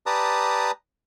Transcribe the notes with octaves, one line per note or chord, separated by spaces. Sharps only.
G4 B4 D5 A5 A#5 D#6